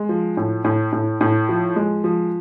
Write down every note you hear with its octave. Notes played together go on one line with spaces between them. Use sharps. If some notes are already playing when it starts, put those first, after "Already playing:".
Already playing: G#3
F3
A2
A2
A2
A2
F3
G#3
F3